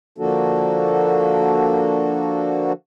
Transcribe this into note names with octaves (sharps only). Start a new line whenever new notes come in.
D3 F3 A#3 D4 F#4 A4